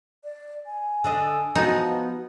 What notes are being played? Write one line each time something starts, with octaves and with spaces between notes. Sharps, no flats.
D5
G#5
D3 D4 D#5
F3 B3 D#4 F#4
B4